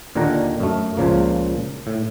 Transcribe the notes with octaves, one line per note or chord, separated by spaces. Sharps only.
D#2 A#2 D3 D#3 F#5 A#5
F#2 A3
C#2 A#2 C#3 F3 A#3
A2